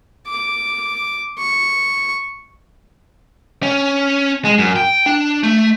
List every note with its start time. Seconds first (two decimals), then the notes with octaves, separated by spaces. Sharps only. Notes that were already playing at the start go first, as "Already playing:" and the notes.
0.27 D6
1.38 C#6
3.63 C#4
4.45 G#3
4.58 F#2
4.76 G5
5.06 D4
5.44 A3